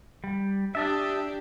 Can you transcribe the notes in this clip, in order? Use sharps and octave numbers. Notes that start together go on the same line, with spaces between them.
G3
D4 G4 E5 A5 D#6